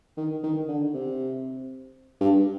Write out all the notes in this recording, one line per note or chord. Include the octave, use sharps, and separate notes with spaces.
D#3
D#3
D3
C3
G2